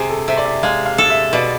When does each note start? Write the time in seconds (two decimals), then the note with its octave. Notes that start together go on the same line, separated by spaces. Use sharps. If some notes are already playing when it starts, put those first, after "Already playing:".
Already playing: C3 G#4
0.10 A4
0.28 C3 E5
0.37 D5
0.45 E5
0.63 G#3 F5
0.86 F5
0.98 A4
1.10 E5
1.33 B2 D5